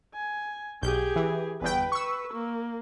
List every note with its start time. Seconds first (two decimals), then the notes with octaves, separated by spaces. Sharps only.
0.14 G#5
0.83 B1 G4 G#4 G6
1.16 E3
1.61 G1 E2 B4 G5
1.92 C#6 E6
2.33 A#3